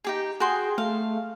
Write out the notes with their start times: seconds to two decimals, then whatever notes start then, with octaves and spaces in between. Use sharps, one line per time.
0.04 D#4 G4 G#4
0.40 F#4 G#4 G5 C6
0.78 A3 F5